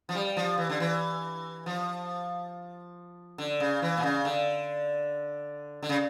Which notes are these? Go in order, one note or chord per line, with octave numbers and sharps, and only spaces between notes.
F3
G3
F3
E3
D3
E3
F3
D3
C#3
E3
A#2
C#3
D3
D3
C#3